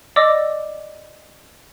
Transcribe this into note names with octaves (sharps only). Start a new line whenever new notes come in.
D5 D#5 D6 E6 A#6